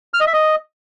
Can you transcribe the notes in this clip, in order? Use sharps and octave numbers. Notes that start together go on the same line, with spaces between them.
F6
D#5
E5
D#5